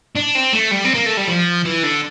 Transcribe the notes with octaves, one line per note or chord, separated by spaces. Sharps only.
D4
C4
A3
G3
C4
A#3
A3
G3
F3
E3
D3